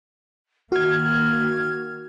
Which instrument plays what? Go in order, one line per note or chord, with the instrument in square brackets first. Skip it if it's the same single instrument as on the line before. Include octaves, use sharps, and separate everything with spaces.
[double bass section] D#3 A#3 [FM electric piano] F#4 G#6 [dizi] F6